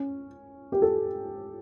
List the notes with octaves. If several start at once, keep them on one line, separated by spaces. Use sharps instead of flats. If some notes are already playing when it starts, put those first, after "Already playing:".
Already playing: C#4
G4
A4